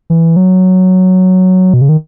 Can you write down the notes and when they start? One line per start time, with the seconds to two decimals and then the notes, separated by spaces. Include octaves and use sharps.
0.10 E3
0.36 F#3
1.74 B2
1.81 C#3
1.89 D#3